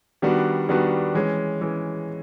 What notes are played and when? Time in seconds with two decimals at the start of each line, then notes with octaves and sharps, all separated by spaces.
0.22 D#3 G3 B3 D4 F#4
0.69 D#3 G3 B3 D4 F#4
1.15 E3 G#3 C#4
1.61 E3 G#3 C#4